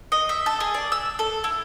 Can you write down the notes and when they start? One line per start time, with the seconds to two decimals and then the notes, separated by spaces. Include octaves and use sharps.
0.12 D#5
0.29 E5
0.46 A4
0.60 G#4
0.74 D5
0.92 E6
1.19 A4
1.44 E4